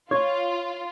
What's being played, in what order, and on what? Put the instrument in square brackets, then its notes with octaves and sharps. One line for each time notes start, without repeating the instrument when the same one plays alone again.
[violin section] F4 [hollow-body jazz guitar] C#5